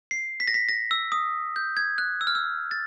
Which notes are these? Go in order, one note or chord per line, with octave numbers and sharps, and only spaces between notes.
C7
B6
A#6
B6
A#6
E6
D#6
G6
G#6
F#6
E6
F6
E6
A6